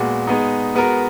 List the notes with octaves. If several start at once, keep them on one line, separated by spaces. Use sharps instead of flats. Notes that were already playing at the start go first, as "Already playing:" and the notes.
Already playing: A#2 G#3 B3 F#4
G#3 B3 D#4
G#3 B3 F#4 A#4